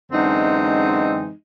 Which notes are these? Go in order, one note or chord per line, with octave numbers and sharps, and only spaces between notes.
F#2 D3 E3 G#3 C4 D#4